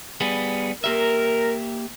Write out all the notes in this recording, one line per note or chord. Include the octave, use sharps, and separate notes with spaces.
G3 B3 G#4
A#3 G4 A#4 E5